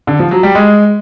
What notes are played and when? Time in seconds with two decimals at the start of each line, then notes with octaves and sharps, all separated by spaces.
0.07 D3
0.19 F3
0.31 F#3
0.43 G3
0.55 G#3